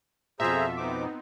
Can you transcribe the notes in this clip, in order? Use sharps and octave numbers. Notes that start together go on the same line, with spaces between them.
F2 B2 F4 G#4 A4 C5 E5 A#5
B3 C4 D#4 D6